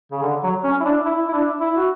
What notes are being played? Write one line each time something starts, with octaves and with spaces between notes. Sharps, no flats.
C#3
D3
F#3
C#4
E4
D4
E4
E4
D4
E4
F#4